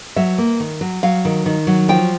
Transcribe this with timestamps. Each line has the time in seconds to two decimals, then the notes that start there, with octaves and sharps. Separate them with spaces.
0.16 F#3 E5
0.38 A#3
0.60 D#3
0.81 F#3
1.03 F#3 F5
1.25 D#3
1.46 D#3
1.67 F#3
1.89 F3 G5